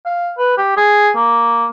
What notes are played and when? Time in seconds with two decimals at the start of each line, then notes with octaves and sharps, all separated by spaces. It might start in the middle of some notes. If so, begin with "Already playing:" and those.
0.06 F5
0.39 B4
0.58 G4
0.77 G#4
1.16 A#3